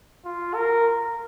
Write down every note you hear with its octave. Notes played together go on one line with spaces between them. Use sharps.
F4
A#4